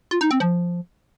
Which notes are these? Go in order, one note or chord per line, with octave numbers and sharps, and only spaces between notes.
F4
D#4
C4
F3